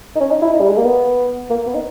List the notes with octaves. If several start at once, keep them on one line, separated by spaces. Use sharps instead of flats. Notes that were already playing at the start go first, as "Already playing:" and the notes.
D#4
C#4
D#4
E4
D#4
G3
G#3
A#3
B3
A#3
B3
D#4